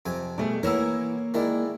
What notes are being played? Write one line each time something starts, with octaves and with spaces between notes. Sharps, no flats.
F2 C3 G#5
B2 G3 A3 G#4 D5
E3 A#3 B3 E4 A#4 C#5 E6
D#3 G#3 E4 A#4 D5